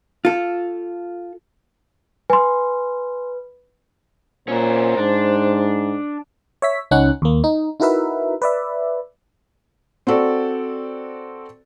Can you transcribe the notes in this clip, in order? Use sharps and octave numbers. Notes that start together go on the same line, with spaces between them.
F4 A4
B4 G#5 C6
A#2 C#4 A#4 C5
G#2 D4
C#5 E5 B6
C#2 C#4 D#4 F#5 F#6
D#2 A#3
D#4
D#4 E4 F#4 A#4 B4 E5
B4 D5 E5
C4 F#4 A4 D5